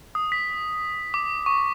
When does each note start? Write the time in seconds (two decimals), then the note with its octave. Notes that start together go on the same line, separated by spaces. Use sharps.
0.15 D#6
0.32 B6
1.14 D6
1.46 C#6